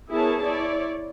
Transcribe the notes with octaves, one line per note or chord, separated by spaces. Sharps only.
B3 E4 G#4 A#4 C#5 A5
E4 C#5 D5